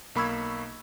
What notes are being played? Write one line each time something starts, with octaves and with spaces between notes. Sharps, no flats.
B1 A#3 B5 C#6 E6 G#6